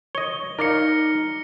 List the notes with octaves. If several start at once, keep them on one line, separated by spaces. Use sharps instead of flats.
C#5 D#5 G7
D#4 A#4 D5 F5 F6 A#6 C#7